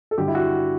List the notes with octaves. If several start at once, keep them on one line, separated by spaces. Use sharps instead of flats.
A4
G2 D3 G4
E4
F#4